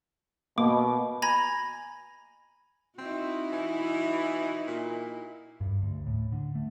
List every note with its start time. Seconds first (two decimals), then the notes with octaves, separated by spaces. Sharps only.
0.58 B2 A#3 D6
1.22 G#5 A#5 B5 G#6 A#6
2.98 C4 D#4 E4 F#4
3.52 E3
4.67 A#2
5.61 G2
5.82 D2
6.06 A2
6.32 D3
6.55 A3